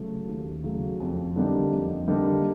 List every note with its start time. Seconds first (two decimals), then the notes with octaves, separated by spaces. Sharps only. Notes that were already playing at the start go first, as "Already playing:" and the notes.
Already playing: C#3 F#3 A3
0.28 D#2
0.64 C#3 F#3 A3
1.00 F2
1.36 D3 G3 A#3 D#4
1.72 F2
2.08 D3 G3 A#3 D#4